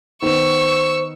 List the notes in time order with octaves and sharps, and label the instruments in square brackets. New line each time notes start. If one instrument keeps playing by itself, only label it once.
[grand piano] D#3 B3 [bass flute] C5 [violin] C#6 E6